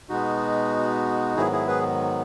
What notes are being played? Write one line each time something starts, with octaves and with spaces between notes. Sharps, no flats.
B2 G#3 B3 D#4 F#4
G#2 D#3 F#3 B3 E4 G#4
E4 G#4
G#4 B4